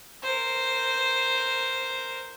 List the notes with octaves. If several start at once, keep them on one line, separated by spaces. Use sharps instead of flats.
A#4 C5